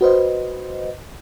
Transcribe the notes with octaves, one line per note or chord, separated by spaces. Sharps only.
F#4 B4 C5 D#5